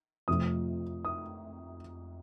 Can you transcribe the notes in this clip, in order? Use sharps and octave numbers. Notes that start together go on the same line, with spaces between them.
F2 C3 F3 A3 D#6
D#6